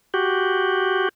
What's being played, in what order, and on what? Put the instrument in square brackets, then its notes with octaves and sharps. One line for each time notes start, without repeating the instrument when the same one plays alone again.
[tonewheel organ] F#4 G4